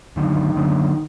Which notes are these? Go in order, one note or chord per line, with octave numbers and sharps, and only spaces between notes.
F#2 D3 D#3
F#2 D3